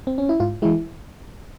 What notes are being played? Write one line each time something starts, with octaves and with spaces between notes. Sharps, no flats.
C4
C#4
E4
G#2 F4
E3 G#3 E4